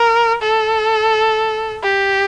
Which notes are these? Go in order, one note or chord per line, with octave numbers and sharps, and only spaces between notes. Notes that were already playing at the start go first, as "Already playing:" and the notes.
Already playing: A#4
A4
G4